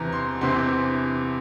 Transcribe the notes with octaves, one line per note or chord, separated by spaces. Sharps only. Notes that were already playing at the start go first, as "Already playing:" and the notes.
Already playing: E2 C3 E3 A#5
C6
E2 C3 E3 C6